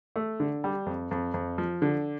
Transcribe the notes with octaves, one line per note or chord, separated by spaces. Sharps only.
A3
D3
G3
F2
F2
F2
F3
D3